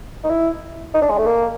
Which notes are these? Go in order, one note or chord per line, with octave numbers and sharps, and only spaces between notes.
D#4
E4
D#4
D4
G#3
A3
A#3